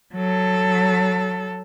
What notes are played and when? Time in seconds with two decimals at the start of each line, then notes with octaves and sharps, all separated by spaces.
0.15 F#3 A4